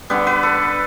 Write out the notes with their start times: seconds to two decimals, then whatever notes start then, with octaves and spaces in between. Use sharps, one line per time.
0.10 D3 G3 B3 B4
0.27 B4
0.43 A4